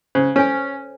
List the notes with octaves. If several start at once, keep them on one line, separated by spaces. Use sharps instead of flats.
C#3 C5
C#4 A4 C#5 G#5